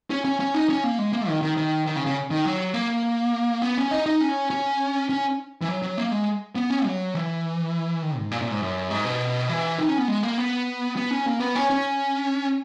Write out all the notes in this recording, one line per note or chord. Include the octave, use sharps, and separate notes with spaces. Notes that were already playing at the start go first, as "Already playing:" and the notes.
C#4
C#4
C#4
D#4
C#4
A#3
G#3
A#3
D#3
D#3
D#3
D#3
C#3
C#3
D#3
F#3
A#3
B3
C#4
D#4
D#4
C#4
C#4
C#4
E3
F#3
F#3
A#3
G#3
B3
C#4
F#3
E3
D#3
G#2
A#2
A#2
G#2
F#2
G#2
B2
E3
D#4
C#4
B3
G#3
A#3
B3
B3
C#4
A#3
B3
C#4
C#4